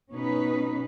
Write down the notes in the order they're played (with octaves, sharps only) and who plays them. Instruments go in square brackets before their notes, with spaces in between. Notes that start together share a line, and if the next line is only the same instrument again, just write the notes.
[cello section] B2 C#4 D#4 B4